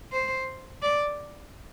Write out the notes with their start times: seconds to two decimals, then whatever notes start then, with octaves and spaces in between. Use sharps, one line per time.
0.12 C5
0.82 D5